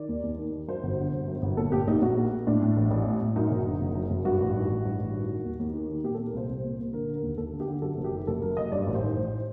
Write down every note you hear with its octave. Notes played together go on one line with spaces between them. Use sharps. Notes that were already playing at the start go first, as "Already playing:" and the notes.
Already playing: D#3 D5
D#2
D#2
D#3
D#3
F#2 C5
G1
D3
G1
F#2
G1
A#2 A4
A#2 G4
A#1 D#4
A#1 F#4
A#2
A#2
A2 D4
A2
A1
A1
A2
A2
F#2 D#4
F#1
D3
F#1
F#2
F#1
G2 F#4
A1
D#3
A1
G2
A1
D#3
D#3
D#2
D#2
D#3
D#3
A#2 G4
A4
A#2
A#4
C2 C5
C2
A#2
A#2
D3 A#4
D3
A#4
D#2
D#2 A4
D3
G4
D3
F#2 A4
F#1
G4
D#3
F#1 A4
F#2 A#4
F#1 D#5
G2 D5
A1
C5
D#3
A1